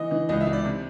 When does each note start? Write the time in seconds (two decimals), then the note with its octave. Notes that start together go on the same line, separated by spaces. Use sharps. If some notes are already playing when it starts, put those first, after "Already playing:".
Already playing: E3 D#5
0.11 E3
0.29 C#2 D#5
0.40 E5
0.47 C#2
0.53 D5
0.65 C3